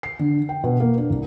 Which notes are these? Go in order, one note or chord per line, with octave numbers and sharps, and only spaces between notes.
C7
D3
G5
B2
A#3
D4
C2